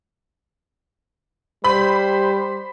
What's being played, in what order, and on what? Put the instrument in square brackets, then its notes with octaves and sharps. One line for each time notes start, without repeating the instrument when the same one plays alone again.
[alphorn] G3 [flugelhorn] C5 [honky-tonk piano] B5